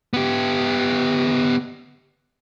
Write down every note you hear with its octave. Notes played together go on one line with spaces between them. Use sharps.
B3 G4